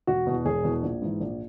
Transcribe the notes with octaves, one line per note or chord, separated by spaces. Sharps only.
E1 F#4
E2 B2
E1 G#4
E2 B2
A#1
G#2 E3
A#1